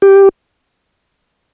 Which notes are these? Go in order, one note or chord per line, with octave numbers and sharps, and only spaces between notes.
G4